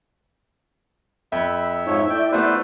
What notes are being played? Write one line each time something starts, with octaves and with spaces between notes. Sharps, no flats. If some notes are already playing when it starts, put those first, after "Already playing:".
F2 E5 B5
G#2 F3 D#4 C#5
A3 E4 D5 G5
G3 A3 B3 B4 C5